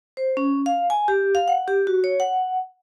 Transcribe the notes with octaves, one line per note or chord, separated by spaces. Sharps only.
C5
C#4
F5
G#5
G4
F5
F#5
G4
F#4
C#5
F#5